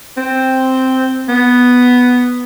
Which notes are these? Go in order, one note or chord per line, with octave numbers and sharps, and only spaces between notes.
C4
B3